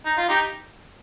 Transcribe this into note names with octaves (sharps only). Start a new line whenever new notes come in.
D#4
F4
D#4 G4